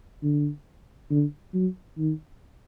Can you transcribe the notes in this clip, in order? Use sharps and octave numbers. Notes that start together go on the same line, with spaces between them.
D3
D3
F#3
D#3